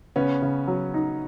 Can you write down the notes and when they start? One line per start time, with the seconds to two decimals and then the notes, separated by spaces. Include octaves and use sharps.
0.16 C#3 B3 C#4
0.42 C#3
0.67 F#3
0.94 D#4